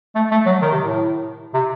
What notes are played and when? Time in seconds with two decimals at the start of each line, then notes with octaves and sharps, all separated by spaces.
0.15 A3
0.31 A3
0.46 F#3
0.62 D#3
0.71 C3
0.82 A2
1.54 C3